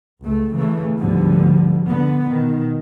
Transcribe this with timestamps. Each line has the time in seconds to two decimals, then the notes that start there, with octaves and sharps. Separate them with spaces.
0.23 C#2 A3
0.55 C#3 E3 A3
0.99 D2 G#2 D3 F3 G3 B3
1.88 D3 B3
2.30 B2 D#3